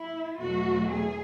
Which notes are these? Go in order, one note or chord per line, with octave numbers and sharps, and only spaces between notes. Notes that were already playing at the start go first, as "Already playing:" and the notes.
Already playing: E4
E2 B2 F#3 A3 F#4
G#4